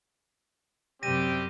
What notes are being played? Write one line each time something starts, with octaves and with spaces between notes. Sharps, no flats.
F#2 C3 G3 C4 G4 A#6 D#7